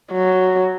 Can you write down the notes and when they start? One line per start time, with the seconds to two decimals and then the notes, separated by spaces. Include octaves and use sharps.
0.12 F#3